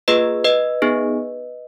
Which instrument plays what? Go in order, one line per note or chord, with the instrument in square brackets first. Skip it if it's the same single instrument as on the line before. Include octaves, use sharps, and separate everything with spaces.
[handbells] A#3 F4 G#4 B4 D#5
B4 D#5
B3 D#4 G#4